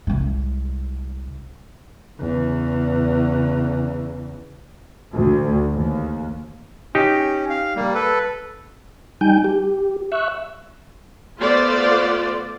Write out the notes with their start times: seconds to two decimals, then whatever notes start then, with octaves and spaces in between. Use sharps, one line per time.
0.07 C2 G#3
2.20 E2 C#3
5.14 D2
5.73 D#2
6.95 C#4 D#4 G4
7.50 F5
7.76 G3 A#3
7.95 A4 B4
9.21 G3 D#4 G5 G#5 G6
9.44 G4
10.12 E5 C#6 E6 F#6
11.39 A3 B3 F4 C5 D5